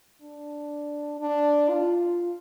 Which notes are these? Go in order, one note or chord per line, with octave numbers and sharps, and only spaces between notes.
D4
D4
F4